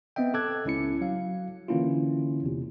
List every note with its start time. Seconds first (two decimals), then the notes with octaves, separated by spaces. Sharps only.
0.16 B3 C4 D#5 E5 G5
0.34 A4 A5 D6 E6 F#6 G#6
0.65 C#2 C#4 E4 C#7
1.01 F#3 F5
1.68 D3 E3 A#3 C#4 E4 F4
2.43 E2 C3